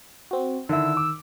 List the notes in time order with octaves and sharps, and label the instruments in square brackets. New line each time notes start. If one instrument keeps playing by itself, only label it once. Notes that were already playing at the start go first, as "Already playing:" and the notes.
[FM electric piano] C4 F#4
[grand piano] D3 E4 [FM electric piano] D#3 [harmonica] E6
[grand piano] D6